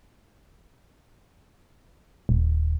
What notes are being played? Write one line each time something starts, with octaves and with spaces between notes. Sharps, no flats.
D#1